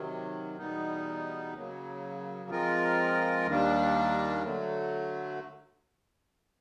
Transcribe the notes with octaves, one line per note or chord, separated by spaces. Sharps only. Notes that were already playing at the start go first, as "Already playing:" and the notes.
Already playing: C3 D#3 F#3
E2 B2 G3 B3 D#4
C#3 F#3 A#3
F3 G#3 C4 F4 A#4
D#2 D#3 G3 A#3 D4
D3 F#3 A3